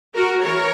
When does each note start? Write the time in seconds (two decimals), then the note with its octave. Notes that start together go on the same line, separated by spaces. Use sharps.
0.15 F#4 A#4
0.44 E3 A#4 C#5